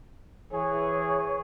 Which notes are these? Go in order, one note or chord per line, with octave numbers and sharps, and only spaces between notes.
E3 G#4 C#5